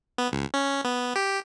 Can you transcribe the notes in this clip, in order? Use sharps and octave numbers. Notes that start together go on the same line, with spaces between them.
B3
C#2
C#4
B3
G4